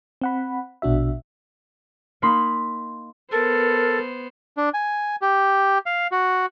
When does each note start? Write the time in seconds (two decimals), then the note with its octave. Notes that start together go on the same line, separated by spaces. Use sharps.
0.22 C4 F#5 B5
0.82 A#1 B2 D4 F#4 E5
2.22 A#3 D#4 B5 C6
3.32 B3 A4 A#4 C5
4.57 D4
4.74 G#5
5.22 G4
5.86 F5
6.12 F#4